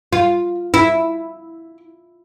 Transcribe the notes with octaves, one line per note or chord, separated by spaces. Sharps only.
F4
E4